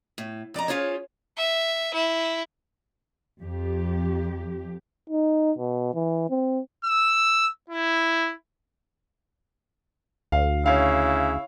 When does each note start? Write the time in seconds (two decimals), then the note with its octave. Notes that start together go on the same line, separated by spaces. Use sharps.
0.18 A2
0.54 F2 D5 D#5 A#5
0.68 C#4 D4 F4 G#4 C5 C#5
1.37 E5
1.94 E4
3.41 F2 G4
5.10 D#4
5.58 B2
5.94 E3
6.30 C4
6.85 E6
7.70 E4
10.32 D2 F5
10.66 C#3 E4 C#5 F5